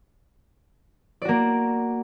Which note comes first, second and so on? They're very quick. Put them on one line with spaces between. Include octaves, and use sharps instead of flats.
D5 F#4 A#3